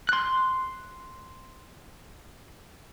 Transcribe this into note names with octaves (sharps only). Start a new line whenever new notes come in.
C6 F#6